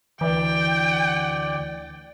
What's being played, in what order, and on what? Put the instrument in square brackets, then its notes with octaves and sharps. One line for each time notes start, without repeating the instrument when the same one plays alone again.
[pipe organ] D2 D5 [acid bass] E3 [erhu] G5